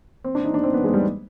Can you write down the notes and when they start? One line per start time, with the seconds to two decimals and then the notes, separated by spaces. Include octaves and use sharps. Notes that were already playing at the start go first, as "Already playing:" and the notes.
0.24 C4
0.35 D4
0.45 D#4
0.54 D4
0.64 C4
0.74 B3
0.84 G#3
0.94 G3